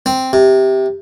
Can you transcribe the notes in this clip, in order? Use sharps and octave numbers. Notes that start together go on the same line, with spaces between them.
C4
C3